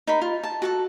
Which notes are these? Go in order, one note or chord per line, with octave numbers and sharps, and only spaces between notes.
D#4 A#4 B5
F4
A5
F#4 A4 A5